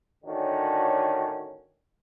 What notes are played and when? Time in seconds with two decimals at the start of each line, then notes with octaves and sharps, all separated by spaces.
0.24 A2 D3 D#3 C#4 D4 F#4